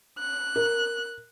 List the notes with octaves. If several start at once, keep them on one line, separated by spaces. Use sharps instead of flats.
F#6
A#4